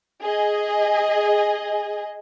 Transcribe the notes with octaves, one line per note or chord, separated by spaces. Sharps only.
G#4 D#5